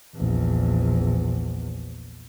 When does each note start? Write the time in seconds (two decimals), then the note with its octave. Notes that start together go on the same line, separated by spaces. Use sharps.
0.15 A#1 E2